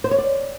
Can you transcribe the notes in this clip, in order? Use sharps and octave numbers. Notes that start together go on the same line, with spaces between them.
C5
C#5
D5